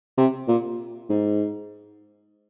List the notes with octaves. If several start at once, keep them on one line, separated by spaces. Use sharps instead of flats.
C3
A#2
G#2